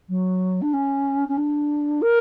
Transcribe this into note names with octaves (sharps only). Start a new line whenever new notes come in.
F#3
D4
C#4
C#4
D4
A#4